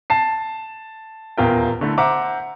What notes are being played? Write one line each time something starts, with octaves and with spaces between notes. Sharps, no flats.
A5 C7
D#1 E2 F4 A#4 G5
D3 A3 E4
C5 E5 F#5 A#5 D6